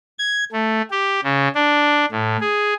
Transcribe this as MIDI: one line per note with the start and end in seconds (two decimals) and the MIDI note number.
0.19 0.44 92
0.52 0.82 57
0.91 1.20 67
1.24 1.48 49
1.55 2.05 62
2.11 2.37 45
2.40 2.74 68